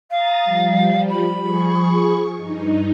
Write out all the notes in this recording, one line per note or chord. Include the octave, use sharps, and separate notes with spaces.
F5 A#5 D#6 A6
F3 G3
B5
F3 G#4 C#6
G2 D#4